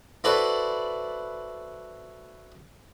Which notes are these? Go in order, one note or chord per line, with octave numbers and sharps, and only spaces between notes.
E4 F#4 A4 B4 C5 D5